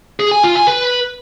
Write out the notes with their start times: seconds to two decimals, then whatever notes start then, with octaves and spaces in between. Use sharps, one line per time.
0.20 G#4
0.32 G#5
0.43 F4
0.55 G#5
0.67 B4